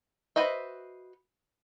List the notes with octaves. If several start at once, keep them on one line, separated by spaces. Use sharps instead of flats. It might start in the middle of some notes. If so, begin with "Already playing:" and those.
F#4 B4 C5 D#5 E5